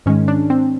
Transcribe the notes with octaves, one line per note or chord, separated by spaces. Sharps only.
G#2 D#3 G#3 C#4
D4
C4